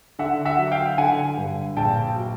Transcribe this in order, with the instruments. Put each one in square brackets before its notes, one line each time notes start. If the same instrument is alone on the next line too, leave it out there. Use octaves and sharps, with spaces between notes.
[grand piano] D3 E5 F#5
E5 F#5
F#3
F5 G5
D3 F#5 G#5
G2
A#1 G5 A5
F#3